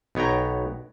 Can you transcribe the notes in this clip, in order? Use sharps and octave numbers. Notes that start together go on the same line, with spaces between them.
B1 B3 C#5 G5 A#5